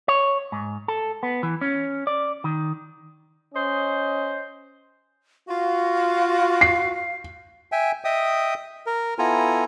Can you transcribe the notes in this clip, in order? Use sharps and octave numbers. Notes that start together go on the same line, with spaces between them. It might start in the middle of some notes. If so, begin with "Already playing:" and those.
C#5
G#2
A4
B3
E3
C#4
D5
D#3
C#4 C5 D#5
F4 F#4 F5
C7
E5 G5 G#5
D#5 E5 G5 D#6
A#4
B3 E4 F4 A4 G#5 A#5